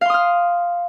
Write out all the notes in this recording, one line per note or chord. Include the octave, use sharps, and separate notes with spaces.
F5 C6 D#6 F6